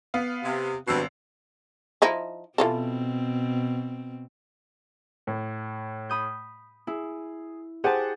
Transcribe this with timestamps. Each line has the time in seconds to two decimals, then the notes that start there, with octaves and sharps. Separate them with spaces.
0.14 B3 F5
0.44 C3
0.88 G#1 G2 B2 E6 C7
2.02 F3 D#4 E4
2.58 B2 E3 C4 F4 A4
5.27 A2
6.09 B5 D#6 G6
6.87 E4 G#4
7.84 G4 G#4 C5 F#5 G#5 A5